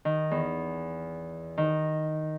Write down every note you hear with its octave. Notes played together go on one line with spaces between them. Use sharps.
D#3
E2
D#3